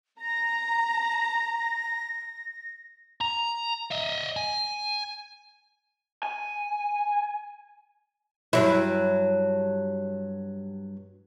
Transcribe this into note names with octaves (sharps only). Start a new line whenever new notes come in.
A#5 A#6
A#5
D#5 E5
G#5
G#5
G2 F#3 E4